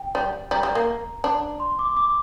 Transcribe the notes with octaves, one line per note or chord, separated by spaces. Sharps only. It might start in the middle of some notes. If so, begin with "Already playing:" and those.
Already playing: G5
G3
G3 A#5
G3
A#3
D4
C6
D6
D6